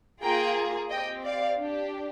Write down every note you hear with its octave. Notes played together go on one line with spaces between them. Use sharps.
A#3 F4 G#4 G5 A#5
C4 G4 D#5 G5
D5 F5
D4 G4